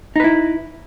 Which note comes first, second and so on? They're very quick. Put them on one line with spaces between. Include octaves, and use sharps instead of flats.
D#4 B4 E4